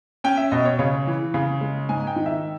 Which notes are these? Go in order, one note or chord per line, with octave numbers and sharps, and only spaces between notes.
C#4 G5
E5
B2 D#5
C#5
C#3 C#5
E3
C#3
G#3
G#2 G#5
G5
D#3
E5